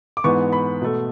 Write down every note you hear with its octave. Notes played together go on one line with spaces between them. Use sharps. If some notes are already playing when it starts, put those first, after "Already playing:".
D6
G#2 E3 B3 C#6
B5
B2 A3